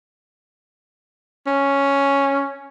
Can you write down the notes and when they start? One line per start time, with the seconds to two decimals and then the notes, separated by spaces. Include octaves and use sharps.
1.47 C#4